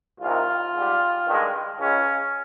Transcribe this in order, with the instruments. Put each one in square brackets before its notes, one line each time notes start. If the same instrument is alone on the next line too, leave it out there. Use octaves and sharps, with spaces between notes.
[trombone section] C2 C3 D#3 F4
G#2 G3
G2 D#3 G#3
C#2 C#3 G#3 C#4